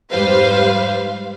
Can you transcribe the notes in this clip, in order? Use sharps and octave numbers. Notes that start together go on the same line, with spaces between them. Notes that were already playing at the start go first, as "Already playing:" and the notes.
F2 G#2 G3 B4 C5 F5